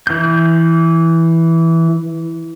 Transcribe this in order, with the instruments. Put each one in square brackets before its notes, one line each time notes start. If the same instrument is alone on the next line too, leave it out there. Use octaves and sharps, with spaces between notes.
[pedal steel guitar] E3 G6